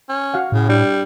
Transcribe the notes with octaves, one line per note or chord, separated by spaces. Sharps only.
C#4
F#4 F5 F#5
A2 C#3
G3 D4